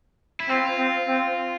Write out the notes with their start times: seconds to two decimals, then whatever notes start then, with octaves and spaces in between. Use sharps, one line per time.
0.40 E4
0.49 C4 F4
0.78 C4
1.08 C4